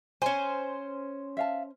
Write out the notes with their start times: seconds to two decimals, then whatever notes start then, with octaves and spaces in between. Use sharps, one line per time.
0.22 C#4 C5 G#5
1.37 E5 F5 A5